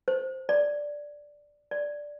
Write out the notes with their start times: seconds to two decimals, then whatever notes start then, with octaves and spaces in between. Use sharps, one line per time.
0.08 C5
0.49 D5
1.71 D5